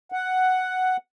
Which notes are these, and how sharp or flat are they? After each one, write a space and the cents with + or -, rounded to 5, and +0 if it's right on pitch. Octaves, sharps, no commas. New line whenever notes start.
F#5 +5